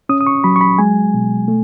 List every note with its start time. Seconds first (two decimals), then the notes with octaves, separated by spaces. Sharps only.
0.09 C#4 D#6
0.21 D#6
0.27 C#6
0.44 F#3 B5
0.56 C#6
0.61 B5
0.78 G#3 G#5
1.14 B2
1.48 A3